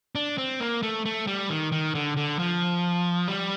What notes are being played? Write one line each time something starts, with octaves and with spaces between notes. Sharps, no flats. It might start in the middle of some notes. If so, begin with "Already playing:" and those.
D4
C4
A#3
A3
A3
G3
D#3
D#3
D3
D3
F3
G3